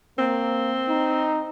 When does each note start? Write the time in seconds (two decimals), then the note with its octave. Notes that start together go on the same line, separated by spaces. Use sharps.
0.19 A#3 C4
0.89 D#4